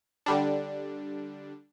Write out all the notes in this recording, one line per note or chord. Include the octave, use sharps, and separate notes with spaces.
D3 G3 D4